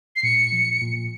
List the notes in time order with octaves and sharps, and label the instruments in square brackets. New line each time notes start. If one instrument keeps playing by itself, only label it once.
[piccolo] C7
[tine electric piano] A#2 [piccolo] C#7
[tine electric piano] F3
A#2